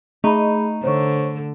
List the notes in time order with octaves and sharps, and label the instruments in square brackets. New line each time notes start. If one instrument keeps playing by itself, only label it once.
[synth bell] A3 [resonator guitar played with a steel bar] D#4 [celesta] G#4 B5
[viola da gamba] D3 [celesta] C5 C#5 C#6